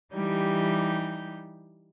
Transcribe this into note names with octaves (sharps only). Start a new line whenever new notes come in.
E3 G3 D#4 G4 G6